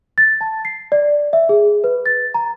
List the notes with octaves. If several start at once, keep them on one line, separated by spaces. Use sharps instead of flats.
A6
A5
C7
D5
E5
G#4
B4
A6
A#5